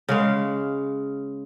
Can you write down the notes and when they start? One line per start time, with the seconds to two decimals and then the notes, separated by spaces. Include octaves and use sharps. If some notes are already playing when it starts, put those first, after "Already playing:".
0.09 C#3 G#3 F5